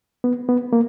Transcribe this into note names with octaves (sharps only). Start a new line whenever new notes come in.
B3
B3
A#3